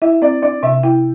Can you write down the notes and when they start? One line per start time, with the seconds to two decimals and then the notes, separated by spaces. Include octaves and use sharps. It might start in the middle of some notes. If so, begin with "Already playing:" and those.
0.02 E4 E5
0.22 C4 D5
0.42 D4 D5
0.63 C3 E5
0.83 E4 G5